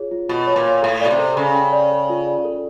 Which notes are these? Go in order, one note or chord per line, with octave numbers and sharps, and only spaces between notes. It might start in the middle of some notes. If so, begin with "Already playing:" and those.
Already playing: F4 G#4 C#5
F4
B2 F4
C#5
A#2
C#5
A2 A4
B2 D5
C3
A4
C#3 A4
G5
D5
A4
F4
D5
A4